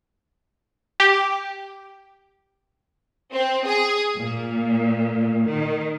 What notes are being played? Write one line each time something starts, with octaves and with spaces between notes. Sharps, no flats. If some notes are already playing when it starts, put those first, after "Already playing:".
G4
C4
G#4
A#2
D#3